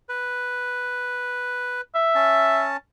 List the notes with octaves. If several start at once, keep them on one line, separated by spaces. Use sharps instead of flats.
B4
E5
C#4 A5